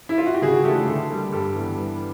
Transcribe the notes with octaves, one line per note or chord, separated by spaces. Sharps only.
E4
F4
F#4
G4
C#3 F#4 G#4
E3 A3 D4 F4 G4 A4
D3 G4 A4
G3 A#3
G2 G4 A4
E3 G3 B3